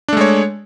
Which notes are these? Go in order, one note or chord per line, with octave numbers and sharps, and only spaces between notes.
G#3 A3 D4 C#5